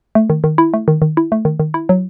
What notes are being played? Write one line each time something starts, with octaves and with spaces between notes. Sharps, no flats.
A3
D#3
D#3
E4
A3
D#3
D#3
E4
A3
D#3
D#3
E4
F#3